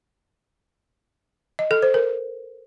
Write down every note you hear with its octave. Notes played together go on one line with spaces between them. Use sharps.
D#5
A4
C5
A#4